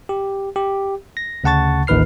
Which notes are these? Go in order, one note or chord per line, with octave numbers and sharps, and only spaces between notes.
G4
G4
A#6
D2 C#3 F#5 A5 C#6 A6
A1 D#2 D#4 B4 F6 C7